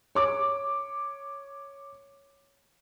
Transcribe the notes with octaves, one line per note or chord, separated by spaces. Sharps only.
C#5 D6